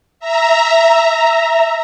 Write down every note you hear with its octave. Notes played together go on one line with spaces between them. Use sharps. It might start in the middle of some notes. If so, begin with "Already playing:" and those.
E5 A#5